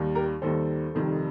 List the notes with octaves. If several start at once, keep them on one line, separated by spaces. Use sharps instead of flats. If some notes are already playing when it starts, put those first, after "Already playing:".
Already playing: D#2 D#3 G3
G4 A#4
D#2 D#3 G3 A4 C5
F1 F2 D#3 G3